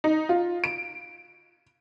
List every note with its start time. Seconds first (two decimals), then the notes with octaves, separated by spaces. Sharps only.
0.04 D#4
0.29 F4
0.64 D7